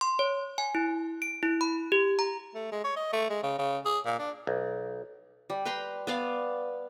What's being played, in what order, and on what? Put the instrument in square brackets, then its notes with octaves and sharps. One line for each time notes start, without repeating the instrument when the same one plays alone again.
[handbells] C6
C#5
G#5
E4
D7
E4
B5
G4
A#5
[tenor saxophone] A3
G#3
C#5
D#5
A3
G#3
C#3
C#3
G#4
A#2
D4
[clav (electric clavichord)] B1
[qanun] G3
B4 G5 A#5 C6
B3 D5 F5